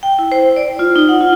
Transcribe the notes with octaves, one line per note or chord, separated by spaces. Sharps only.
G5
E4
C5
D5
F4
D#4
F#5
F4